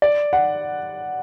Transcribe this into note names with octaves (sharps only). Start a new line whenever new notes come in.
D5
F#5